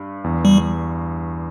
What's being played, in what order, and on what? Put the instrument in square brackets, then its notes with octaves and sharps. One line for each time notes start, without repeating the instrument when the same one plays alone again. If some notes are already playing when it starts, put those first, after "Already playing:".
Already playing: [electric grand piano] G2
E2
[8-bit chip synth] G3